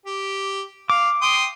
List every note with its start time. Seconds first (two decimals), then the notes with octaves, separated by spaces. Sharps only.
0.06 G4
0.90 F5 D6
1.22 G5 C6 D#6